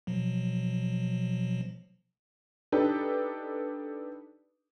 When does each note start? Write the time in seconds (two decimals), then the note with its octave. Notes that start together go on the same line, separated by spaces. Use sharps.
0.07 B2 F3 F#3
2.72 D4 D#4 G4 A4 B4